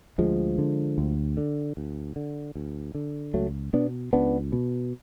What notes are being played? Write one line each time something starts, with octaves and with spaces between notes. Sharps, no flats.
D2 F3 G#3
D3
D2
D3
D2
D3
D2
D3
C#2 F#3 A3
B2 B3 D4
C#2 B3 D4
B2